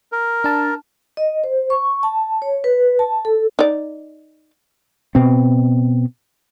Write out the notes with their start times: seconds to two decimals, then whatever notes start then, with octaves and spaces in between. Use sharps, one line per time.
0.12 A#4
0.44 D4 A5
1.17 D#5
1.44 C5
1.70 C#6
2.03 A5
2.42 C#5
2.64 B4
2.99 A5
3.25 A4
3.59 D#4 D5
5.15 B2 C4